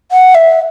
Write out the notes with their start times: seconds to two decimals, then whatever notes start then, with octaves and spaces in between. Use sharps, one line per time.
0.12 F#5
0.35 E5